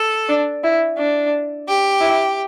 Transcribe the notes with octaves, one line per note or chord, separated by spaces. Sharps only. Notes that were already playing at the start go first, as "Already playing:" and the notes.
Already playing: A4
D4
E4
D4
G4
E4